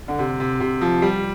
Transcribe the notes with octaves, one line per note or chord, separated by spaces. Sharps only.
D3
C3
C3
C3
F3
G3